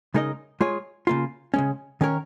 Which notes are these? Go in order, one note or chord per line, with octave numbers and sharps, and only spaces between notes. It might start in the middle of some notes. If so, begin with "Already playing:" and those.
C#3 G#3 D#4 A#4 D#5
G#3 F4 G#4 C#5
C#3 A#3 F4
C#3 G#3 C#4
D#3 C#4 A#4 C#5